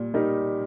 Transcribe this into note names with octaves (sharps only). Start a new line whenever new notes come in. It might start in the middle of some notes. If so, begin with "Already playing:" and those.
Already playing: A#2 G3
G3 D#4 G4 A#4